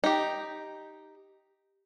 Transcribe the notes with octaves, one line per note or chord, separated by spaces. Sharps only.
D#4 G4